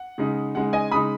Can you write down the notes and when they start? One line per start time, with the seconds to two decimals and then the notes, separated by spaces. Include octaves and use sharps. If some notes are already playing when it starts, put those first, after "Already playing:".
Already playing: F#5
0.18 C#3 G#3 D#4
0.55 C#3 G#3 D#4 F#5
0.73 D#5 G#5
0.92 C#3 G#3 D#4 B5 D#6